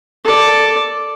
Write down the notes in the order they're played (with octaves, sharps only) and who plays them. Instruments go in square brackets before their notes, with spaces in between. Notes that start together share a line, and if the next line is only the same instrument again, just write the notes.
[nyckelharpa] A4 D5